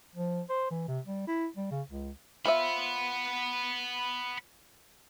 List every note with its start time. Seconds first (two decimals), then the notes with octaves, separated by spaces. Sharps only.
0.16 F3
0.49 C5
0.70 E3
0.88 C3
1.06 G3
1.27 E4
1.56 G3
1.71 C#3
1.89 C#2
2.45 F4 C5 E5 F#5 B5